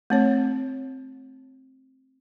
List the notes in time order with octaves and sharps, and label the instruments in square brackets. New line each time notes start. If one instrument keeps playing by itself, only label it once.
[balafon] A3 C4 C#5